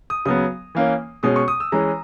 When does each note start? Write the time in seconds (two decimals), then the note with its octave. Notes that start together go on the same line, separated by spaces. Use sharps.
0.10 D#6
0.25 C#3 F#3 B3 D#6
0.75 E3 A#3 C#4
1.23 B2 G#3 C#4 D#6
1.36 C#6
1.48 D#6
1.60 E6
1.72 E3 G#3 C#4 A#5